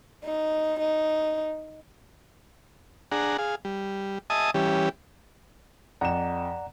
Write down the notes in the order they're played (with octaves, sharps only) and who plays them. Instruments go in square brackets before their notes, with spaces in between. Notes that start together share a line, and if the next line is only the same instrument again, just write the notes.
[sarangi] D#4
D#4
[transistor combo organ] D4 G#4 F#5 A#5
G#4 F5
G3
D#5 E5 G#5 A5 D#6
E3 G3 C#4 G4
[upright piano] F2 E7 [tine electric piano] D5 F#5 A#5